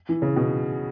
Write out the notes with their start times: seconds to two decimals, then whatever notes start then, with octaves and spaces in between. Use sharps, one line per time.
0.09 E3
0.22 C#3
0.36 B2